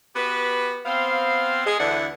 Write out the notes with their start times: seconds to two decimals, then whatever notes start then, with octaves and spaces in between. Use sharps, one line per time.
0.16 B3 F#4 G4 B4
0.86 B3 C4 F5
1.67 G#3 G#4
1.80 D2 D3 E3 E4 D5 F#5